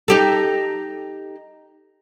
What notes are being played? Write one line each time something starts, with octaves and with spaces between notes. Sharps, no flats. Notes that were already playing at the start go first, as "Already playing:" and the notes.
D#4 G4 A4